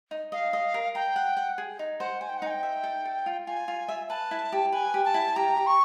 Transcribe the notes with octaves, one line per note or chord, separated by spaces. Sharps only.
D#4
D#5 F5
D#5
A#4
G5 A#5
F#5
F#5
G#4
D#4
C5 F#5
C5 G#5
G5
F#5
D#4 G#5
G5
E5
A4
A4
F4
F4 G#5
F4
E5
B4 A5
E4
G4
B4 G#5
G4
A5
E4
G4 A#5
G4
C#6